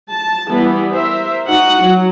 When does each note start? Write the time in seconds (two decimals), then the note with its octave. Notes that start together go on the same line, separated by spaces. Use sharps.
0.10 A5
0.48 E3 G3 B3
0.92 A#4 C5 E5
1.45 D#4 F#4 F#5
1.80 F#3